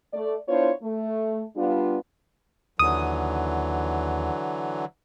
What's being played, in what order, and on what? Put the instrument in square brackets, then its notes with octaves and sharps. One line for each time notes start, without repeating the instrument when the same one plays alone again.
[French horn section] A3 D5
B3 D4 E4 F4 C5 C#5
A3
G3 B3 D4 F4
[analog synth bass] D#2 [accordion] D3 E3 F#3 [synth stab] D#6